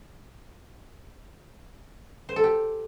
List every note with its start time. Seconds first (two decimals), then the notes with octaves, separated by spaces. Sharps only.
2.29 C5
2.36 A4
2.44 G4